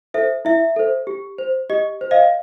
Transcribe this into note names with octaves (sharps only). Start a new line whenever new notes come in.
A4 C5 E5
E4 E5
A4 C5
G4
C5
G4 D#5
C5
D#5 F5